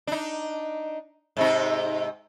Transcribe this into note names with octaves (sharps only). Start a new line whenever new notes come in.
D4 D#4
G#2 C3 D#4